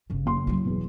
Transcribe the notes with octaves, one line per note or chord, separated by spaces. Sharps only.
G1 C#3
F#1 C6
F#3 E4
E2 B2